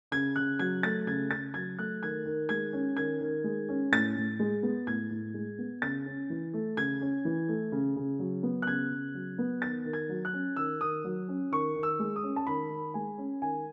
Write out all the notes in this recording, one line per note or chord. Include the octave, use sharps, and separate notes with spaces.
C#3 G#6
C#3 F#6
F#3 G#6
A3 A6
C#3 G#6
C#3 A6
F#3 G#6
A3 F#6
D#3 G#6
D#3
G#3 G#6
C#4
D#3 G#6
D#3
G#3
C#4
A2 A6
A2
G#3
B3
A2 G#6
A2
G#3
B3
C#3 A6
C#4
E3
A3
C#3 G#6
C#4
E3
A3
C#3
C#3
F#3
B3
F#6
C#3 G#6
C#3
F#3
B3
D#3 A6
D#3
G#6
F#3
F#6
C#4
D#3 E6
D#3 D#6
F#3
C#4
D#3 C#6
D#3
E6
G#3
D#6
C#4
A5
D#3 B5
D#3
G#3 G#5
C#4
D#3 G#5